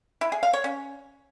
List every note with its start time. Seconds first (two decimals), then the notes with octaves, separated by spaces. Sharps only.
0.21 E4
0.32 G#4
0.43 F5
0.53 C#5
0.64 C#4